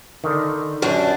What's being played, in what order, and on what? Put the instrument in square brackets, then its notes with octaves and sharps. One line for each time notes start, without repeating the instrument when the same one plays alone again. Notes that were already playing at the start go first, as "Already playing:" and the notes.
[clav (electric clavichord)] D3 D#3
[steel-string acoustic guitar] F#2 D4